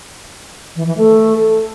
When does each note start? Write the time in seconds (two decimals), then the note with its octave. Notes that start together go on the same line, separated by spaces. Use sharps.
0.76 E3
0.87 E3
0.97 A3